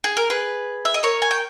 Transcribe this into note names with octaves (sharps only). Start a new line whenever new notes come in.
G#4
A#4
G#4 B4
E5
D#5
A#4 C#5
G#5
G5